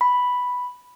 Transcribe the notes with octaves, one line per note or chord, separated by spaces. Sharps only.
B5